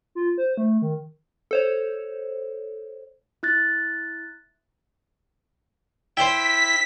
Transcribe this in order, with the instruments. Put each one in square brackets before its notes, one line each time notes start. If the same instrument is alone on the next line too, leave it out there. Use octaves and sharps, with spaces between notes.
[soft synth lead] F4
C5
A3
D#3
[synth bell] A4 C5 C#5
[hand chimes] E4 F#6 A6
[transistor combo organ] E4 E5 [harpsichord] C5 G5 [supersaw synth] B6